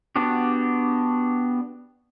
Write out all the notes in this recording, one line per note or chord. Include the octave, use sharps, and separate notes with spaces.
B3 D4 F#4 G4